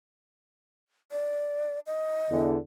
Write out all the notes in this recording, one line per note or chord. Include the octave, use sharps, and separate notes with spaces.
D5
D#5
E2 D3